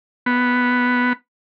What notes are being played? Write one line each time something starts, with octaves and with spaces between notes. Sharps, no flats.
B3